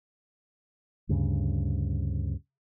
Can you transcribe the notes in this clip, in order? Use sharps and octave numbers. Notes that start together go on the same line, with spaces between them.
D2 G2 C#3